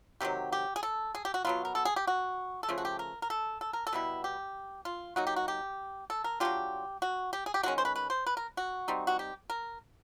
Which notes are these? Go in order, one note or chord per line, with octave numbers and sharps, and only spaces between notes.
C3 D#3 F#3 G4
G4
G#4
A4
G#4
G4
F#4
B2 F#3 B3 F4
A#4
A4
G#4
G4
F#4
A4
C#3 F3 A3 G#4
F#4
G4
A#4
A#4
A4
A4
A#4
A4
B2 G3 B3 E4
G4
F4
F#3 A#3 D#4 F#4
G4
F#4
G4
A4
A#4
F#3 B3 D4 F4 G4
F#4
G4
G#4
G4
D#3 G#3 C#4 F#4
C5
B4
B4
C5
B4
A#4
F#4
G3 C4 D#4
F#4
G4
A#4